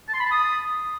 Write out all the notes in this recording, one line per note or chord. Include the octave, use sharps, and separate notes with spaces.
A5
C6
B5
A5
D#6